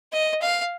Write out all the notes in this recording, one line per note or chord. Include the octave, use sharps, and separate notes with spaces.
D#5
F5